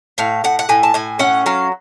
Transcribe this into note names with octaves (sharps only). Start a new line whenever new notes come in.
A2 F5
A2 F#5
F#5
A2 G#5
A5
A2 G#5
C#4 F#5
F#3 F5